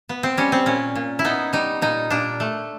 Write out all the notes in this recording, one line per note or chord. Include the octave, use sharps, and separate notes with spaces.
B3
C4
G3 C#4
C4
A#2 C#4
A#2
E4
B3 D#4
G3 D#4
A#2 D#4
A#2 D4
A3